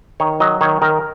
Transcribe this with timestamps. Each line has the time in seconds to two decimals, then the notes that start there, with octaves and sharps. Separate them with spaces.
0.20 D#3 C#5
0.40 F#3 D#5
0.61 D#3 C#5
0.82 D#3 A#4